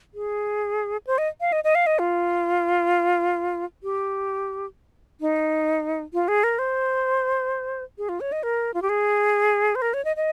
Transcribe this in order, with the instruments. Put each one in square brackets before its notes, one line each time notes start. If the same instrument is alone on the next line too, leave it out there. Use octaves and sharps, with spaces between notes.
[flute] G#4
C5
D#5
F5
D#5
D#5
F5
D#5
F4
G4
D#4
F4
G#4
A#4
C5
G#4
F4
C#5
D#5
A#4
F4
G4
G#4
C5
A#4
C#5
D#5
D#5